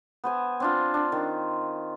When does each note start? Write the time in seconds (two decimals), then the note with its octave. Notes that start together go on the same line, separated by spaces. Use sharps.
0.24 B3 C5 G#5
0.60 C4 D4 F4
0.94 D4
1.12 D#3